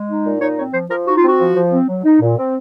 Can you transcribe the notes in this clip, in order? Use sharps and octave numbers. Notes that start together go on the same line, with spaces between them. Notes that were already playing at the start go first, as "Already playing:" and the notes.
Already playing: G#3
D#4
A#2
D#4 C#5
C4 C#5
F3 C5
F3 A#4
D#4 F#4
F4
C4 F#4
F3
F3
C4
F#3
D#4
A#2
C4